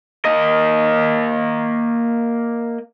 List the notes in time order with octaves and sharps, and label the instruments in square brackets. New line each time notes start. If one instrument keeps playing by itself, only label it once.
[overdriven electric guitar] A#3 D#5